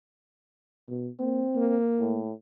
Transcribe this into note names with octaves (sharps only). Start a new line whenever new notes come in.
B2
A#3 C4
A#3
A2